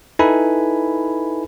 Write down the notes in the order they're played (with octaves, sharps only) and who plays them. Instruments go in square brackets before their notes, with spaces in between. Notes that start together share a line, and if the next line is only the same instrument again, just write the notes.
[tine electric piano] D#4 E4 A4 B4 G#5 B5